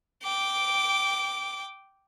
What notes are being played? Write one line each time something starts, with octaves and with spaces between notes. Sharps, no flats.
G5 D6